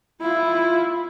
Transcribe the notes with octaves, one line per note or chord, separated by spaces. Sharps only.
E4 F4